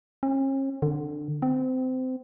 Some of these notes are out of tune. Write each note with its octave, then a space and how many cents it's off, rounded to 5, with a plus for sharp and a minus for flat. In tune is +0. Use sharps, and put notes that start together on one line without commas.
C#4 -45
D3 +20
C4 -25